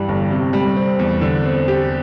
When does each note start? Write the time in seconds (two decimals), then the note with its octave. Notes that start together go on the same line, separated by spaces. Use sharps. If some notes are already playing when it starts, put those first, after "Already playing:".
Already playing: G2 E3 G3
0.08 G1
0.30 C3
0.53 G3
0.76 C4
0.99 E2
1.21 D3
1.45 C4
1.68 G4